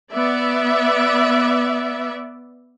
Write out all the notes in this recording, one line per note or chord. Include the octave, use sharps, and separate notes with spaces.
B3 D5 E5